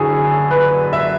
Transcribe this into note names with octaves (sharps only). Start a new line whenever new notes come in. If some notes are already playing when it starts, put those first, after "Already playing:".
Already playing: F#1 F#2 D3 E4 F#4 G#4
B4
E5